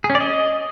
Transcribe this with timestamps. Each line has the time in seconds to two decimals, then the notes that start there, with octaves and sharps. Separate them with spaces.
0.04 G#4
0.10 C#4
0.15 D5
0.20 D#5